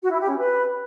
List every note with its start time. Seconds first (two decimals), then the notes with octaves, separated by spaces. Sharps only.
0.02 F#4
0.11 E4
0.20 G4
0.29 C#4
0.38 B4